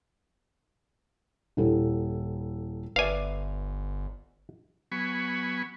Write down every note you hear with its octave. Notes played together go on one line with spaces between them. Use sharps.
D#1 E4 A4
G1 B4 D5 E5 F5 G#5
F#3 B3 G#5 B5 C#6